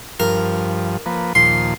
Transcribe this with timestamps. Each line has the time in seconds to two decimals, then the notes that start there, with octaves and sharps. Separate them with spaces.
0.20 G2 F3 A#4
1.06 F3 A#3 B4
1.35 D#2 A#2 F3 C6